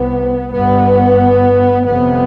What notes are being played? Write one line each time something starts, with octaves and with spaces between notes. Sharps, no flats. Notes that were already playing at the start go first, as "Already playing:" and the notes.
Already playing: C2 C3 B3
G1 G2 B3
G1 F2 C3 B3